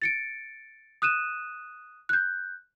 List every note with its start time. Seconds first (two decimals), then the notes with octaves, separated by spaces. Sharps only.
0.02 A6 C#7 D7
1.02 D#6 F#6 D#7 E7
2.09 F#6 G6